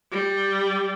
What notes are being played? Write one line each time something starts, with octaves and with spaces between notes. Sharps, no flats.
G3